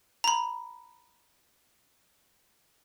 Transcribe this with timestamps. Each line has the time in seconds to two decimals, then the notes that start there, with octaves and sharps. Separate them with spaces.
0.24 A#5 B5